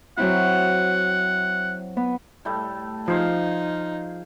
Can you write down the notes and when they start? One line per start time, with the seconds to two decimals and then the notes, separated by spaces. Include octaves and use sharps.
0.18 F#3 C4 E4 F#5
1.97 B3
2.45 A2 G3 A3
3.08 F3 D#4 G#4 C5 F5